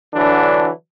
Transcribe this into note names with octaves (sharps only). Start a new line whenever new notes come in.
D3 E3 F#3 D4